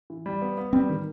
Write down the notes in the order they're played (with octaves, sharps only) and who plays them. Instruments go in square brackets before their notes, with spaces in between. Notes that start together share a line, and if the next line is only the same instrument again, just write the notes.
[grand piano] E3
G3
B3
B3
[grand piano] G3 [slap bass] C4
[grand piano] D#3